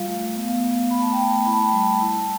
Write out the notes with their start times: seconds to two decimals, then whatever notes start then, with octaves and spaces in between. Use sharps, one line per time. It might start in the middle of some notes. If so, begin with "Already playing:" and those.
Already playing: G3 F4 F5
0.08 A3
0.36 B3 F5
0.63 B3
0.91 A3 B5
1.02 A5
1.12 G5
1.18 A3
1.23 A5
1.46 E4 B5
1.53 A5
1.61 G5
1.68 G3 A5
2.01 E4